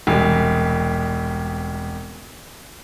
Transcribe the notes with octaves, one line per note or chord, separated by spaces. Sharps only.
E1 C2